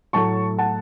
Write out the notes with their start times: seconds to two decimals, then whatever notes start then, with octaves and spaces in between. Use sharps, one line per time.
0.13 A2 F#3 A3 A5 C#6
0.58 F#5 A5